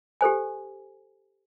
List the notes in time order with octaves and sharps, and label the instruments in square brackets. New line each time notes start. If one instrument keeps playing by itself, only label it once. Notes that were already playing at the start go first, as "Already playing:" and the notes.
[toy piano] G4 A4 C5 G#5